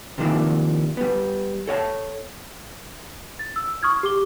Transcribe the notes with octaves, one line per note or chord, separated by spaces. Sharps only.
C3 D#3 F3 A#3 D4 E4
G3 B3
A4 C#5 F5 A5
A6
E6
C#6 D#6 F6 G#6
G4 D6 G7